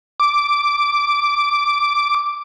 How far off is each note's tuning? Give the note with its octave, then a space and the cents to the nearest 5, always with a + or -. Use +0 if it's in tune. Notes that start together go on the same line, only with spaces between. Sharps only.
D6 -5